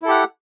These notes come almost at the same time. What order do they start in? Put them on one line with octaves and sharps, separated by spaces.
E4 A4 G4 F#5